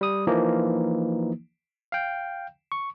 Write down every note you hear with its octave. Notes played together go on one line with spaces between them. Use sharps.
G3 D#6
E3 F3 A#3 D#4
F5 G5
C#6